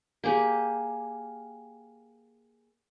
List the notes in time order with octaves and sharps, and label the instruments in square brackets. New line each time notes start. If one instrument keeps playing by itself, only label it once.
[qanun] A#3 G4 G#4